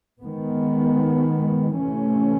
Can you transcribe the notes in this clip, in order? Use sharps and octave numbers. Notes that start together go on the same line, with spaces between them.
D#3 G#3 B3
C3 E3 A3 C#4